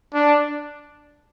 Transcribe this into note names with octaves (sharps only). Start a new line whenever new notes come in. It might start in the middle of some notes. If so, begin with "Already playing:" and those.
D4